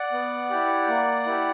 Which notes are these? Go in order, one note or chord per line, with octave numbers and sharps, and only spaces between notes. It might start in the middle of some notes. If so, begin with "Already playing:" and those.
Already playing: D5 F#5
B3
E4 G4
A#3
E4 G4